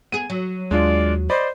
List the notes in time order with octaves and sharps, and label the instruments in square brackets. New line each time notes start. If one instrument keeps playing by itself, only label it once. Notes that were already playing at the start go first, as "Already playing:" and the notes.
[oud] B3 G#4 [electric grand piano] D#7
[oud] F#3
[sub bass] D#2 [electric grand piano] G#3 D4 F4 [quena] D5
[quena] C5 [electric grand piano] D5 D#5 B5